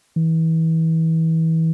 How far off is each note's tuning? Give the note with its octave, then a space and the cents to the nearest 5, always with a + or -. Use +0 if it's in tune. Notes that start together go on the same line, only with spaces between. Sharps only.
E3 -30